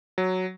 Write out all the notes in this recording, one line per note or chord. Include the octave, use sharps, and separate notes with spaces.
F#3